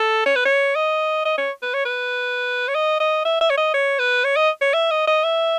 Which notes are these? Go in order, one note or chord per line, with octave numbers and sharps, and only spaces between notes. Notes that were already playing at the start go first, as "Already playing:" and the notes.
Already playing: A4
C#5
B4
C#5
D#5
D#5
C#5
B4
C#5
B4
C#5
D#5
D#5
E5
E5
C#5
D#5
C#5
B4
C#5
D#5
C#5
E5
D#5
D#5
E5